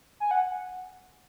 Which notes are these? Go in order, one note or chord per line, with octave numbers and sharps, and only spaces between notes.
G#5
F#5